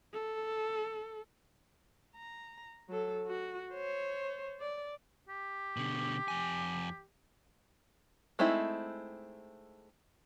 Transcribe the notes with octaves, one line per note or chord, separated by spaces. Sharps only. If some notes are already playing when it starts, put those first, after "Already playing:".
A4
A#5
F#3 A4
F#4
C5 C#5
D5
G4
B2 D3
F2 G#5
G#3 A3 C4 D#4 E4